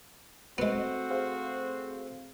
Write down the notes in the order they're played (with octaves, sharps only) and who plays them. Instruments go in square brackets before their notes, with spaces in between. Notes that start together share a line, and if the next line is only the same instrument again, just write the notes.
[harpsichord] G#3 B3 [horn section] A3 C4 [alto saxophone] F#4
[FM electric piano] G#4 C5 F5